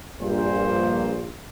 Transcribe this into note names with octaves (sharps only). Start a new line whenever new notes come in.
A#1 G2 A#2 C5